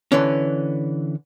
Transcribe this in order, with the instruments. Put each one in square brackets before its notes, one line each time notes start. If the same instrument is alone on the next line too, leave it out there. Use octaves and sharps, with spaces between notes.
[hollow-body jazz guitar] D3 E3 C#4